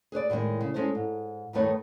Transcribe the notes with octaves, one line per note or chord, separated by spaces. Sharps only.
G#4 B4 C5 D5
A2 D#3 F3 G#3 A#3
C#3
G#3 C#4 E4 A4 C5
G#2
D2 G2 D#3 A3 B4 C#5